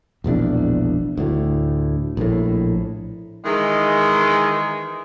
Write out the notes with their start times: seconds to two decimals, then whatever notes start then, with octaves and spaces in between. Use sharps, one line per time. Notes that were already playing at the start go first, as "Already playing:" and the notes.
0.24 E1 A#1 E2 D4
1.17 D2 A2
2.17 A#1 A2
3.44 D#3 E3 G#3